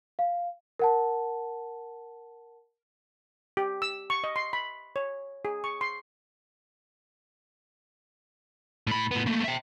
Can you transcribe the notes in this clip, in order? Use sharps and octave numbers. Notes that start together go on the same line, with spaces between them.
F5
A#4 F#5 A5
G4
E6
C#6
D#5
C6
B5
C#5
G#4
C#6
C6
A2 B5
A2 B3
A3 A#3
E5 G5